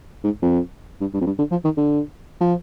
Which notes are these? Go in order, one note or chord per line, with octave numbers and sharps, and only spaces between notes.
G#2
F2
G2
G2
F2
G2
D3
F3
D#3
D3
F3